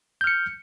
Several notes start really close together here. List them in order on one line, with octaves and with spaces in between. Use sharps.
G6 F6 C#7